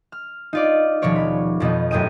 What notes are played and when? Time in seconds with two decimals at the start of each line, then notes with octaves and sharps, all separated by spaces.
0.12 F6
0.53 D#4 F4 D5
1.02 D#1 B2 F3 C#5 D5
1.16 B5
1.60 F2 B2 B3 D#4
1.91 A1 F#2 A2 G5 D#6 D#7